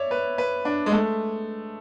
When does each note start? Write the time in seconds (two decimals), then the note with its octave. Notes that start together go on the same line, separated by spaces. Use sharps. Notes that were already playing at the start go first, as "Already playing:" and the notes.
Already playing: C#5 D5 E5
0.11 B4
0.38 B4
0.65 D4
0.86 G#3
0.92 A3